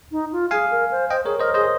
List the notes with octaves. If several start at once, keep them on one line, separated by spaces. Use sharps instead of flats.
D#4
F4
G#4 F5 G#5
A#4
C5
C5 D#5 G5
G#4 A#4 C#5
A#4 C5 D#5
G#4 C5 D#5